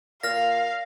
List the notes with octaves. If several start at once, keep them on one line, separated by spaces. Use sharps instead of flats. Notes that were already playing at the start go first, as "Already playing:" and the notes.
A#2 F5 F6 A#6